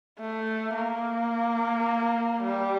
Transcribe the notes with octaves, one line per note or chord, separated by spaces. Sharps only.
A3
A#3
G3